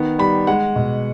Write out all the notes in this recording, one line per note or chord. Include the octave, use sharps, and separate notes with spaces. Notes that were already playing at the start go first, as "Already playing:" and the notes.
Already playing: D#3 B3
G3 B5
G#3 F#5
B2